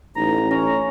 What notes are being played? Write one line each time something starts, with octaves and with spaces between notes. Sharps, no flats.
A1 D#4 A#5
A3 C#4 A#5